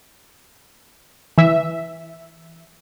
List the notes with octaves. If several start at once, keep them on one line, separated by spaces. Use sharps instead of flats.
E3 E5